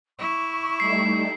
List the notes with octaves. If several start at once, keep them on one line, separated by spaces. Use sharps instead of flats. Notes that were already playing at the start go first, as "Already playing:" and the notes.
E4 C#6 D6
G3 A3 D#4 C7